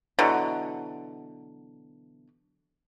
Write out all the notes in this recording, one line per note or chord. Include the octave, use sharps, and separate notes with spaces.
B2 D3 E3 F#3